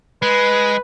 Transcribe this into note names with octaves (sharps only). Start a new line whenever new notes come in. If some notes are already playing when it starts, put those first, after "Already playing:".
G#3 B4